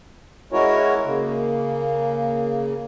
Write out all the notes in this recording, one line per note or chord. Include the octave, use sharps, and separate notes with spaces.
G#3 C#4 E4 F#4 A#4 C#5
C#3 A#3